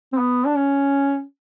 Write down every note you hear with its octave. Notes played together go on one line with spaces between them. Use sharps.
C4
B3
D4
C#4